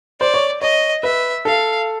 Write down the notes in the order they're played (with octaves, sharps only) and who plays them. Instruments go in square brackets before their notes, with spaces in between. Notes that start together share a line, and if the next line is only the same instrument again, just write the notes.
[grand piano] C5 [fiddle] D5
[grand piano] C#5
[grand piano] C#5 [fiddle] D#5
[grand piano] B4 [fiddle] E5
[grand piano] A4 [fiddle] F5